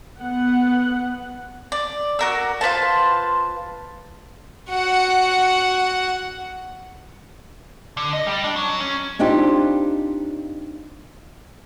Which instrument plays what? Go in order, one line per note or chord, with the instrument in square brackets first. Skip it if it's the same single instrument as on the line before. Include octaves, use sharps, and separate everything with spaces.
[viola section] B3 F#5
[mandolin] D5
F#4 A#4 E6
F4 B4 C5 A5
[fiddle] F#4 F#5
[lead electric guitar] D3
D#5
G3
D4
F#3
C#4
[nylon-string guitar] C4 D4 D#4 F4 G4